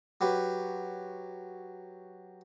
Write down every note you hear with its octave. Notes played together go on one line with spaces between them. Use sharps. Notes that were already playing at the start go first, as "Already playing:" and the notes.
F#3 G4 B4